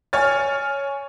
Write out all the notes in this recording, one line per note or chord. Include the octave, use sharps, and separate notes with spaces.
C#5 G#5 F6 A6